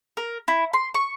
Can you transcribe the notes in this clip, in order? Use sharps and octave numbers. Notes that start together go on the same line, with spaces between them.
A#4
E4
C6
C#6